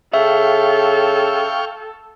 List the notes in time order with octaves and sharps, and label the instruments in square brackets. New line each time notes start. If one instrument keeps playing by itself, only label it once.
[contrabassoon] C#3 [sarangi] A4 [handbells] E5 [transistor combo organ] F5 G5 C#6